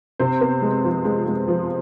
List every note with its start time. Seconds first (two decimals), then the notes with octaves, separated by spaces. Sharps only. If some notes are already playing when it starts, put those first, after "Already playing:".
0.19 C3 C4 C5
0.41 B3
0.62 G#3
0.85 F3
1.05 G#3
1.26 G#3
1.48 F3